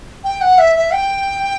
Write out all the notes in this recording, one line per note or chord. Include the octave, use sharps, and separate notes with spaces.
G5
F#5
E5
E5
G5